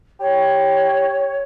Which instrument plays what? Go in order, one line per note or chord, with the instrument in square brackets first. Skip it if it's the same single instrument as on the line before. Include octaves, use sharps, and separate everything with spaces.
[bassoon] G4 [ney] C#5